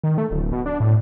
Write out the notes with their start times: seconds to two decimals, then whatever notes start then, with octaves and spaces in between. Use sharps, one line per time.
0.03 D#3
0.18 A3
0.31 D1
0.53 B2
0.66 D4
0.80 A2